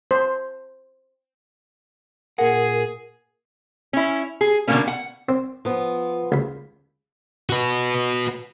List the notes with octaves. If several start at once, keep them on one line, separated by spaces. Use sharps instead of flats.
C5
A#2 G#4 A#4 F#5
C#4 E4
G#4
B2 D3 F#3 A3 A#3 C#4
F#5
C4
F3 B3
C#2 B5
F#4 B4